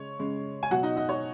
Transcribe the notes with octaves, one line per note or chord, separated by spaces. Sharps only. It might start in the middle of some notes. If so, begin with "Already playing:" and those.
Already playing: C#3 G#3 C#5
C#3 G#3
G#5
B2 F#3 F#4 F#5
D#4 D#5
D#4 D#5
C#5